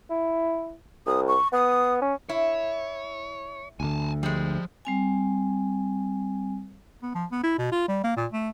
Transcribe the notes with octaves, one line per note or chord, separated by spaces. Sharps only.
E4
C2 D#6
C#6
B3 D#6
C#4
E4 C#5
D2 D3 G#5 A5
F3 G3 G#3
G3 C4 G#5
B3
F3
B3
E4
B2
F4
G3
A#3
A#2
A3